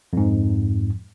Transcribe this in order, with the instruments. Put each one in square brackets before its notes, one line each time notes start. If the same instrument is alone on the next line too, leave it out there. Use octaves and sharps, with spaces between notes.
[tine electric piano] F2 G#2